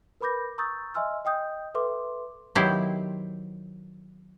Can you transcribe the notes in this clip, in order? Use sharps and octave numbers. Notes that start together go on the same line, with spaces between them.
A#4 B4 B5 D6 G6 A#6
A#5 C#6 D#6 E6 G6 A6
D#5 E5 G#5 C6 E6 F6
D#5 G5 D#6 G6
A4 B4 E5 C6 D6
D#3 F#3 B3 E4 G4 C5